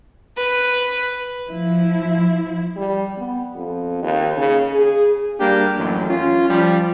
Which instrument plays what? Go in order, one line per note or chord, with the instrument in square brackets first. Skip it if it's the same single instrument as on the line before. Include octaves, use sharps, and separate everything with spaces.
[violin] B4
[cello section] F3 E4
[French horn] G3
B3
F2
D#2
C#3
G#4
[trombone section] G3 A#3 D4 G4
A1 F#2
C#4 F4
F3 G3